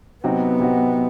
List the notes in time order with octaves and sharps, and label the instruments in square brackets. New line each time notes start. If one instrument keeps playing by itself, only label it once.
[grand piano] C3 F#3 C4 D#4 F#4 [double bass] B3
[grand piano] C3 F#3 C4 D#4 F#4